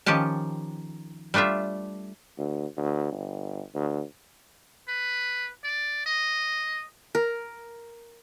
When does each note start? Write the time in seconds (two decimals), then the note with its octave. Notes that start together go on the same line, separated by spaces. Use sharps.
0.06 D#3 F3 C#4 G4 A5
1.34 G3 A3 D4 F4 E5
2.38 D2
2.77 D2
3.12 G1
3.75 D2
4.88 B4
5.64 D5
6.06 D#5
7.15 A#4